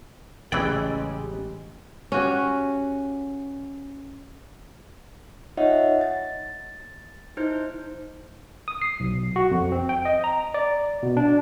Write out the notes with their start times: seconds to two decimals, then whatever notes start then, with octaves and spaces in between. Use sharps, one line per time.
0.52 A1 C#3 E3 G#3 G4 D5 G5
2.12 C#4 F#4 G4
5.57 D#4 F4 C#5 D#5 E5 F#5
6.01 A6
7.37 D#4 E4 C5 G6
8.68 D#6
8.82 C7
9.00 B1
9.36 F#4
9.51 F2
9.72 C4
9.89 G5
10.05 D#5
10.24 A#5
10.54 D5
11.03 B2
11.17 D4